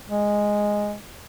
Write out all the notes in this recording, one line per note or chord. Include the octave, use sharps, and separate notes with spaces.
G#3